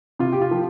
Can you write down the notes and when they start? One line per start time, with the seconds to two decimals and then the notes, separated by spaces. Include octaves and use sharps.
0.19 C3 F4
0.33 G4
0.41 F4
0.51 F3